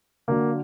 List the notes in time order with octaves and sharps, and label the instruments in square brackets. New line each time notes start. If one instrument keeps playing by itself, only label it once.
[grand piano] D3 F#3 A#3